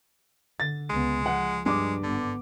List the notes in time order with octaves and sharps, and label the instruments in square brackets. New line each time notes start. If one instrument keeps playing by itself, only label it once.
[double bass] D3 [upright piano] A6
[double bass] C#2 B3 [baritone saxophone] G#3
[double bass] F3 [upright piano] F#5
[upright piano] G2 D6 [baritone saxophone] G#3
[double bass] G#1 B3 [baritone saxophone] D3